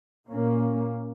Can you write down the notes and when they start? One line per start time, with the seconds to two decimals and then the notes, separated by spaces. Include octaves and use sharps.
0.29 A#2 A#3 C#4